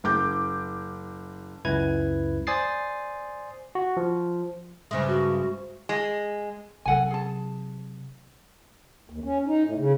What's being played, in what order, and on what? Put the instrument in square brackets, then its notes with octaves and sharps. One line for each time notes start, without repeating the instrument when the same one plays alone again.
[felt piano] F#1 D6 G6
[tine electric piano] C#2 F#2 E4 B4 G#6
C5 D5 G#5 D#6 A6 C7
F#4
F3
[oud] G2 C#3 G#3 [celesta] C5 E5
[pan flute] F#4
[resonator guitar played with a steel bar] G#3
[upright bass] C3 F#3 [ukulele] A4 F#5 G#5
[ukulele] G#4 A5
[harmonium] D#2
C#4
D#4
A2
C#3